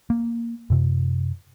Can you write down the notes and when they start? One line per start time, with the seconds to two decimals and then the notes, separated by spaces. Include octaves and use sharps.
0.10 A#3
0.70 F#2 C3